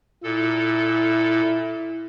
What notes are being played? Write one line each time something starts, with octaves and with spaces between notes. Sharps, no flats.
A#2 E4 A4